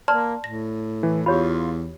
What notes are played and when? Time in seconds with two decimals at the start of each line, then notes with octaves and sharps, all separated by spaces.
0.08 A#3 D5 A5 C6 F6
0.44 A2 A#6
1.03 E3
1.26 E2 F4 G4 C#5 B5